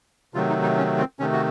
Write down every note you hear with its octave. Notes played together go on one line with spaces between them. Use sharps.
C3 D#3 F#3 A3 F4
D#4
D#4
C#4
C4
C3 D#3 A3 C#4
F#4